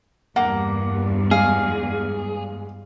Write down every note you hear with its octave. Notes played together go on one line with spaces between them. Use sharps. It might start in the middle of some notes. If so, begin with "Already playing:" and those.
E2 G2 A#3 F#5
G#3 G#4 F5